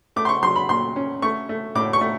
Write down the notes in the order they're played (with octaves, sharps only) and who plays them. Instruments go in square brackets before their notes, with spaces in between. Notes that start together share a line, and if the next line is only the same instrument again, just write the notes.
[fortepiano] A3 D6
C6
C#6
F#3 C6
B5
A#2 C6
C#4
A3 C#6
A3
A2 D6
C#6
A3